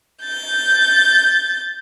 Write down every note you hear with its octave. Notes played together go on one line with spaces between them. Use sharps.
G6 A6